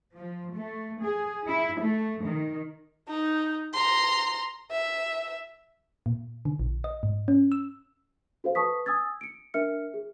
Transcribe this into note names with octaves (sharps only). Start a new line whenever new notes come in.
F3
A3
G#4
E4
A3
D#3
D#4
A#5 C6
E5
A#2
D3
A#1
D#5
G#2
C#4
E6
F#4 A4 C5 F5
B4 A5 C#6 D#6 B6
G#5 D#6 E6 G#6 A6
C#7 D7
D4 A#4 E5 F6 C#7
G#4